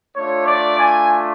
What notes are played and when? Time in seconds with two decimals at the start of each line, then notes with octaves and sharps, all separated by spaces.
0.15 A3 D4 F4 C#5
0.46 D5
0.78 G#5